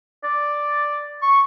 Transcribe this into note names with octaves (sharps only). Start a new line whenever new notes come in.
D5
C#6